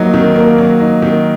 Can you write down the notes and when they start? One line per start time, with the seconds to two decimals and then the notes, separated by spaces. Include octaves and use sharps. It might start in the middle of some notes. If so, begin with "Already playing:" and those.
Already playing: F#3 A#3 D#4
0.14 D#3
0.36 A#3
0.58 F#3
0.80 D#4
1.02 D#3